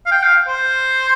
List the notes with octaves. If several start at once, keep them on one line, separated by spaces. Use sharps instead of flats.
F5
G5
F5
C5